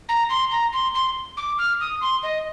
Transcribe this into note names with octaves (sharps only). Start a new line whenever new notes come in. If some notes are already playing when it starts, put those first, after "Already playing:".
A#5
C6
A#5
C6
C6
D6
F6
D#6
C6
D#5